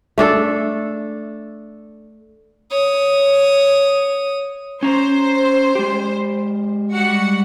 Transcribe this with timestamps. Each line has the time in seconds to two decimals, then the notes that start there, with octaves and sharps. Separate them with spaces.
0.18 A3 D4 A4
2.71 C#5 D#6
4.83 C#4 C5 A#5
5.75 G#3 G4
6.93 G3 F#4 F#5